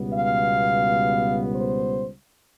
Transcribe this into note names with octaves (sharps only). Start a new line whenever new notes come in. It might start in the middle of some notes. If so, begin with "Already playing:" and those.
Already playing: C#2 B2 G3 B3
F5
C5